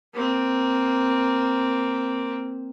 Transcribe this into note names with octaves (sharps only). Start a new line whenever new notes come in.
A#3 C4